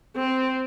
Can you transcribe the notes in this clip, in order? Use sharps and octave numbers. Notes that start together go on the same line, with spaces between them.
C4